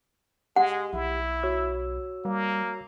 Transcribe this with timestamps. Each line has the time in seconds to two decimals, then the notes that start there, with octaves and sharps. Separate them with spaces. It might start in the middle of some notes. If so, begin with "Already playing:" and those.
0.56 G#3 G4 F#5
0.93 B1 E4
1.43 F#4 C#5 E6
2.25 G3 A#3